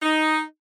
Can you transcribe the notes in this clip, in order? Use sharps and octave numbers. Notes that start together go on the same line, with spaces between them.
D#4